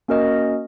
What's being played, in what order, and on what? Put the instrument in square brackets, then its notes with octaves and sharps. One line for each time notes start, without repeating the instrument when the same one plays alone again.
[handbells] A#3 C#4 F#4 A#4 D#5